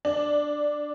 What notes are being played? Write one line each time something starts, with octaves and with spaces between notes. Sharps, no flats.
D4